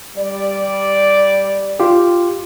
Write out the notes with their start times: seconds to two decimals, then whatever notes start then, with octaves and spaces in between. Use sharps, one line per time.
0.16 G3 D5
1.80 F4 G4